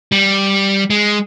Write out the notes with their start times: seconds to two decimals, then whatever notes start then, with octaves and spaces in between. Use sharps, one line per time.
0.12 G3
0.90 G#3